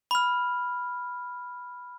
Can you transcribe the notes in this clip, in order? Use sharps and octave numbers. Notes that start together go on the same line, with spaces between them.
B5 F6